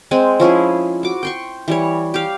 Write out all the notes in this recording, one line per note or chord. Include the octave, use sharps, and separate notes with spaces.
G#3 C4 G#5
F3 C#4 E4 G#4
F#4 D6
G5 C6 C#6
E3 G3 C#5
G4 F5